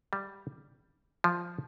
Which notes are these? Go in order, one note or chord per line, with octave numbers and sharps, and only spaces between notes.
G3
F3